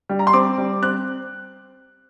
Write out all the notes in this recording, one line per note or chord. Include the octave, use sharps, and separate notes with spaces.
G3
A#5
C6
C4 D6
G3
C4 F#6